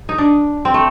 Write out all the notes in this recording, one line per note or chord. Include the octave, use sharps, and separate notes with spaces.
D#4
D4
C4
A3